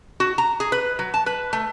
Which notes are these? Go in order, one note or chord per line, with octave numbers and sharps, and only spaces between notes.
F#4
A#5
G#4
B4
F#3
A5
B4
A3